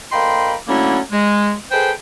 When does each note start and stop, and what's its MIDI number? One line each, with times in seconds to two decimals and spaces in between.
0.12 0.55 38
0.12 0.55 58
0.12 0.55 75
0.12 0.55 79
0.12 0.55 83
0.12 0.55 84
0.68 0.99 50
0.68 0.99 54
0.68 0.99 57
0.68 0.99 58
0.68 0.99 61
0.68 0.99 64
1.12 1.53 56
1.72 1.91 68
1.72 1.91 69
1.72 1.91 71
1.72 1.91 72
1.72 1.91 79